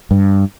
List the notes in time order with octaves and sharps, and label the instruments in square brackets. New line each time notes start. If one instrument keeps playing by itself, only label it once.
[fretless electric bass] G2